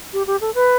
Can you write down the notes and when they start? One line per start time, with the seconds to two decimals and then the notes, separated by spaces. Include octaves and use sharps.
0.13 G4
0.27 G4
0.41 A4
0.55 B4